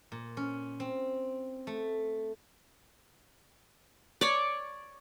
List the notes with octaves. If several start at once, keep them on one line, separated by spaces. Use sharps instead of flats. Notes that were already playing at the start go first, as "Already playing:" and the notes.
A#2
C#4
C4
A3
C#5 D5